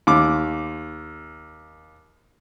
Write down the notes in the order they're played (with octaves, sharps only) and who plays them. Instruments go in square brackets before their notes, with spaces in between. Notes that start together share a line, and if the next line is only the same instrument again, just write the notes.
[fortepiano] D#2 D6